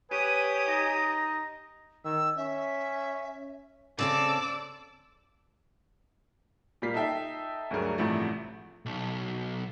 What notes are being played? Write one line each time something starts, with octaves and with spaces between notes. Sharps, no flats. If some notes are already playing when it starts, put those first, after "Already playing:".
G4 B4 C#5 G#5 D#6 D#7
D#4 A#6
D#3 E6
C#4 E5
C#3 C4 A4 D5 D6 E6
A#2 G3 A#3 F4 B6 C7
D#4 A4 E5 G5
D2 G2 F#3 A3 G#4 A#4
A1 G2 C3 E3 F3 A3
B1